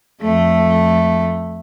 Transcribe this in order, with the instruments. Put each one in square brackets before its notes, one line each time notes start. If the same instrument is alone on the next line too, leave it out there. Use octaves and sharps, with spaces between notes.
[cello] F2 A3